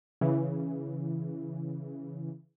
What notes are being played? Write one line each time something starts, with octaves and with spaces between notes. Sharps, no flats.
C#3 E3